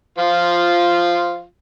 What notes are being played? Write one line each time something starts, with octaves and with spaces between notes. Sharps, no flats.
F3 F4